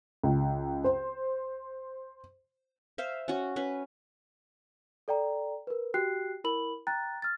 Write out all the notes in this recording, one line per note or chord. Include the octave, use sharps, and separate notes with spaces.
C#2
C5
C5 E5 F5
C#4 F#4
C#4 B4
A4 D5 G5 A#5
A#4 B4
F#4 G4 G5 F#6 C7
E4 A#4 B5 F#7
G5 A#5 F#6 A6
F6 A6